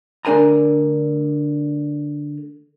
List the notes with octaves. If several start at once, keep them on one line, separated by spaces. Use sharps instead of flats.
D3 A3 D4 A#4 G#5 A#5